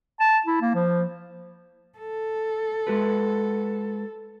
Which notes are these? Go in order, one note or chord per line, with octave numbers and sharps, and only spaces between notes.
A5
E4
A#3
F3
A4
G#3 F#4 B4